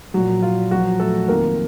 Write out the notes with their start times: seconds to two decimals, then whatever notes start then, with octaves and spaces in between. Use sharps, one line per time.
0.14 A#2 F3 F#3 F#4
0.42 F4
0.71 A#2 F3 F#3 F#4
1.00 A3 A4
1.28 F2 D#3 A#3 A#4